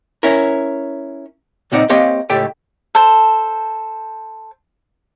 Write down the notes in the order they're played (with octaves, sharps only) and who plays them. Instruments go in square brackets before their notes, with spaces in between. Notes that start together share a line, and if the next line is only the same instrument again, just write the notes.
[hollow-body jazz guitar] C#4 E4 A#4
C#2 A#2 C4 D#4 D5 F#5
A#3 C4 G4 C#5 D#5 F5
C#2 A2 G4 A4 G5
[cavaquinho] A4 C5